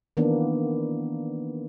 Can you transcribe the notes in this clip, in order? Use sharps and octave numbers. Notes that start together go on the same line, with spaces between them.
D#3 E3 A#3 B3 D4